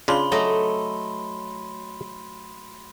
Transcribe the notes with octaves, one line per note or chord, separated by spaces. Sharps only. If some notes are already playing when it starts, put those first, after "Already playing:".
C#3 D4 F4 B5 C6 G7
F#3 A3 D#5